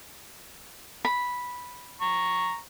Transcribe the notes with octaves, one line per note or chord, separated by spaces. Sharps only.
B5
A#5 C#6